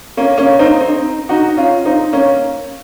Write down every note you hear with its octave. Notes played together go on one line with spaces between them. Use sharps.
A#3 C#4
A#3 C#4
C4 D#4
C4 D#4
D#4 F#4
C#4 F4
C4 D#4
A#3 C#4